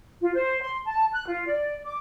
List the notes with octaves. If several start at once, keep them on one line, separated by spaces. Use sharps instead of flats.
F4
C5
C6
A5
F#6
F4
D5
D6